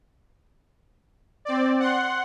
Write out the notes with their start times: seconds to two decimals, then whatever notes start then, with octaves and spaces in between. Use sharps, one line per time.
1.45 C4 D5
1.80 F#5 C6